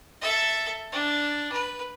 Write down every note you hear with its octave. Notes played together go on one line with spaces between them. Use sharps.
A4 E5
D4
B4